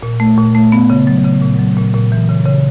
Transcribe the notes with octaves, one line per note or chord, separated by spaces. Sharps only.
A#2
A3
A#2
A3
B3
C#3
F#3
C#3
A#2
F#3
A#2
A#2
E3
C#3
C#3